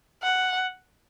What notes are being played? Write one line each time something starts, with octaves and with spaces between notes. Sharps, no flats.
F#5